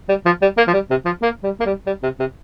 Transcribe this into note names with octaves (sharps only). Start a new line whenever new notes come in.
G3
F3
G3
A#3
F3
G3
C3
F3
A#3
G3
A#3
G3
G3
C3
C3